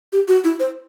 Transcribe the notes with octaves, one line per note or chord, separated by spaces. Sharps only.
G4
F#4
E4
C5